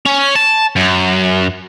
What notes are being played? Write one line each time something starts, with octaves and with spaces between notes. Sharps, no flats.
C#4
A5
F#2